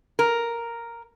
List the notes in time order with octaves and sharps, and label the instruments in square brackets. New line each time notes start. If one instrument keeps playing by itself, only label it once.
[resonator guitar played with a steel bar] A#4